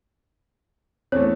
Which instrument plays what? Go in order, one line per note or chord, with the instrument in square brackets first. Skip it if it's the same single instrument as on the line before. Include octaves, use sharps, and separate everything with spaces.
[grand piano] E2 A3 [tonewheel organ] C4 [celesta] C#5